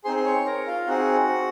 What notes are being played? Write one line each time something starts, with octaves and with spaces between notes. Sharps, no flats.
C4 D#4 G#4 C5 C6
C6
C#5 C#6
A#4 A#5
F4 F5
C4 D#4 F#4 G#4 F#5